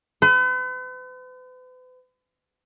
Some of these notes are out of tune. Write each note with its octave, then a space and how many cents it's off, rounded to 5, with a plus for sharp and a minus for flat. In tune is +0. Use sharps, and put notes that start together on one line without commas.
B4 +45